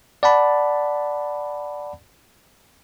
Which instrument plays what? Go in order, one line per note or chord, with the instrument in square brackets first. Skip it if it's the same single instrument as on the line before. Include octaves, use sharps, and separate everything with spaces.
[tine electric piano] D5 F#5 A5 B5